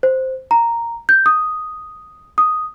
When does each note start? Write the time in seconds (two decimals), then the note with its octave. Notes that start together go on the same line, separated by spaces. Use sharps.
0.03 C5
0.51 A#5
1.09 G6
1.26 D#6
2.38 D#6